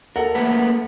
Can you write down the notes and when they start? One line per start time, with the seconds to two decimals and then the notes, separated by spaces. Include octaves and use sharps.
0.16 A4 A#4 F#5
0.35 A3 A#3 B4